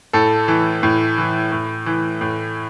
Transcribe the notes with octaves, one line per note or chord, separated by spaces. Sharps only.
A2 A4
E3
A2
E3
A2
E3
A2